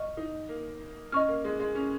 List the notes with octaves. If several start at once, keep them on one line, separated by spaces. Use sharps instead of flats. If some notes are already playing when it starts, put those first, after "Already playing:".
Already playing: D#5 C#6 F6
D#4
A#3
C#4 D#5 C#6 F6
A#3
G#3
G#3
C#4